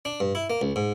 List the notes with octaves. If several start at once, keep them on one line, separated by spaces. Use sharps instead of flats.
D4
G2
E4
A#3
C#2
G#2